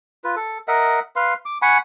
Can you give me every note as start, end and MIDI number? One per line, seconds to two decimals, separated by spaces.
0.24 0.35 65
0.24 0.35 71
0.36 0.58 69
0.68 1.00 70
0.68 1.00 75
0.68 1.00 76
0.68 1.00 78
1.16 1.34 71
1.16 1.34 77
1.16 1.34 84
1.45 1.58 86
1.62 1.78 78
1.62 1.78 80
1.62 1.78 83
1.62 1.78 85